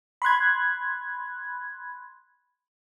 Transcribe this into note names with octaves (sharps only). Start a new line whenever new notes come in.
B5 C6 F#6 G#6